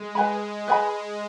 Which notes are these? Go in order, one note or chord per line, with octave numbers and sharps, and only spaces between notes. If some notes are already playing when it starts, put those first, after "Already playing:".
Already playing: G#3
B4 G#5 B5
B4 D#5 G#5 B5